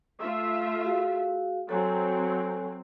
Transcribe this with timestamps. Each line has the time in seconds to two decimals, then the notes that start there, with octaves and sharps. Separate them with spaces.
0.21 A3 F4 E5
0.84 F#4 G#4 F5
1.69 F#3 C4 A4 C#5 G#5